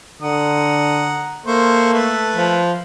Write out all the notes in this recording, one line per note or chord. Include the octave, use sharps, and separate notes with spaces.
D3 F#5 A#5 D#6
A#3 A4 C5 E5 C#6
A3 B4 E5
F3